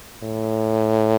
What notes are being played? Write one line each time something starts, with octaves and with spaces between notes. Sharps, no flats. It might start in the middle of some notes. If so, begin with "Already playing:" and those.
A2